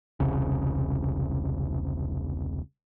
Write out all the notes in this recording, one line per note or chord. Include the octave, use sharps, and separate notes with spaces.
E1 C2 C#3